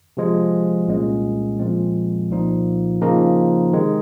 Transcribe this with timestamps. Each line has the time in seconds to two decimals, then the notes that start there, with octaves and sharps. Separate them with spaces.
0.17 C3 F3 G#3
0.88 C2 A#2 G#3 C#4
1.59 A#2 F3 G#3 C4
2.30 C2 A#2 F3 A#3 D#4
3.01 C#3 F3 A#3 D#4 A#4
3.73 C3 D#3 G#3